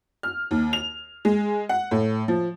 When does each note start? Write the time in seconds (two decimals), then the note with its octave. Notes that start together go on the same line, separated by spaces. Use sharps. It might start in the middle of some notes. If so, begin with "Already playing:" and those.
0.23 F6
0.51 D#2
0.73 F7
1.25 G#3
1.69 F#5
1.91 A2
2.28 F3